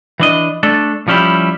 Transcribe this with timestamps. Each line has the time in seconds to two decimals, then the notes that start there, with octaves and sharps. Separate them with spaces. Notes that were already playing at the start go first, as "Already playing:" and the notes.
0.20 E3 D4 D#5
0.63 A3 D4 A4
1.08 F3 G3 C#4 E4 G4